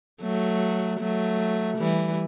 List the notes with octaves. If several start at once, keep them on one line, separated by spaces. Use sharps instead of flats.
F#3 A3
F#3 A3
E3 G3